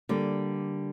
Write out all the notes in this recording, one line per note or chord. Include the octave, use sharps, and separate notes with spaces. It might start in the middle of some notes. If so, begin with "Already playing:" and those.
D3 G3 A#3